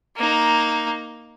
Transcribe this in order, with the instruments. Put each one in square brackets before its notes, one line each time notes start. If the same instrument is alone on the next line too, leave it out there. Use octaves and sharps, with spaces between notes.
[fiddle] A#3 D#4